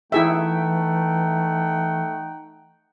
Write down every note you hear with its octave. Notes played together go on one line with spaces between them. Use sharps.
E3 A3 D#4 E4 G#4 E5 F#5 G5